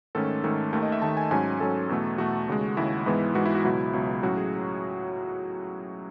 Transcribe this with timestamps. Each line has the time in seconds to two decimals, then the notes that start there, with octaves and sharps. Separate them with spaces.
0.15 G#2 D#3 A3 C#4 A4
0.44 G#2 D#3 A3 C#4
0.73 D#2 D#3 A3
0.83 D#5
0.92 E5
1.02 D#2 D#3 A3 A5
1.17 G#5
1.31 G#2 F#3 C#4 G#5
1.60 G#2 F#3 C#4 A4
1.89 E2 B2 A3
2.18 E2 B2 A3 F#4
2.48 D#2 C#3 G#3
2.77 D#2 C#3 G#3 E4
3.06 G#2 E3 G#3 B3
3.35 G#2 E3 G#3 B3 F#4
3.46 E4
3.55 F#4
3.64 C#2 B2 F#3 E4
3.93 C#2 B2 F#3
4.23 A2 F#3 C#4 F#4
4.37 G#4